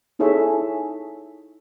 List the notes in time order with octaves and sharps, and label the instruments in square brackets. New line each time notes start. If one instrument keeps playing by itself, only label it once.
[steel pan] D#4 E4 G#4 A4 C#5 E5